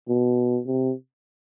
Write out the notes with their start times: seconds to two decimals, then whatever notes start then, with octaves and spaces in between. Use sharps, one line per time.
0.08 B2
0.67 C3